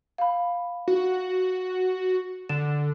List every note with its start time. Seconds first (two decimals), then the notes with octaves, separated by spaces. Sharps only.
0.18 F5 B5
0.88 F#4
2.49 D3 E7